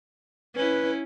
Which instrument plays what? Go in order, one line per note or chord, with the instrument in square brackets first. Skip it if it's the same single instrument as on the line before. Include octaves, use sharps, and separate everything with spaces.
[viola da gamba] C#4 E4 [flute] B4